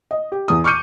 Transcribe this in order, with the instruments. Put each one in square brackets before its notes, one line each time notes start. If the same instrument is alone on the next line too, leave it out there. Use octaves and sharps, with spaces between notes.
[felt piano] D#5
G4
E2 D#6
C#6 D6 F6 G6 C#7 D#7